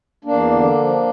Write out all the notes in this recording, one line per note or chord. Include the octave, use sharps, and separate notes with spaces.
E2 A#3 D4
D3
F3